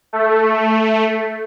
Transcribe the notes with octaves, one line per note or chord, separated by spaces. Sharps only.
A3